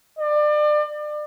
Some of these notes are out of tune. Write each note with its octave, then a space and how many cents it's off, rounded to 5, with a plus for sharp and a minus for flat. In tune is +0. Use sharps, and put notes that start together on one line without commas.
D5 +30